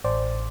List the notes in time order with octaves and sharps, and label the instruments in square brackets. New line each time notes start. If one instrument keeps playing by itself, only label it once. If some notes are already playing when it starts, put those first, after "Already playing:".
[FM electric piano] A1 C5 D5